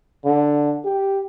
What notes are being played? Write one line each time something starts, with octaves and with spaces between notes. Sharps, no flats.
D3
G4